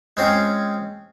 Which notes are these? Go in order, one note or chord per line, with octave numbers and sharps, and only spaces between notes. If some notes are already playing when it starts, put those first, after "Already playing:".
G#3 C4 C#4 F4